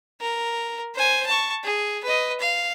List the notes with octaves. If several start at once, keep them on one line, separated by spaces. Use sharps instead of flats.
A#4
C5 G#5
A5 C#6
G#4
B4 D#5
F5